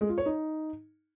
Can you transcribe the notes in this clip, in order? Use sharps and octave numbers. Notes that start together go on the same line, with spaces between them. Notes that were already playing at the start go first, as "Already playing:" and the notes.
G#3
F4
C#5
D#4